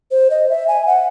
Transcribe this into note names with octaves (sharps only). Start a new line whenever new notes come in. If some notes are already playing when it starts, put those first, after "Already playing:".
C5
D#5
E5
G#5
F#5